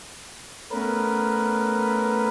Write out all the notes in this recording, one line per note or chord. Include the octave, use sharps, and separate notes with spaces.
A3 B3 C#4 A#4 B4